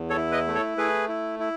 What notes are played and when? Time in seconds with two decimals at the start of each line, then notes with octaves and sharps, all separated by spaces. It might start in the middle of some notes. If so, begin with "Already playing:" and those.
Already playing: E2
0.10 A4 C#5
0.17 E4
0.32 B4 D#5
0.48 A3
0.55 A4 C#5
0.78 A3 G#4 B4
1.09 E4
1.40 E4